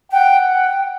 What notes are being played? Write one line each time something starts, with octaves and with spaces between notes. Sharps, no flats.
F#5 G5
G5